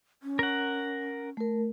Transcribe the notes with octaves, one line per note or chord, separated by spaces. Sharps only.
C#4
A#4 F#5
A3 A#4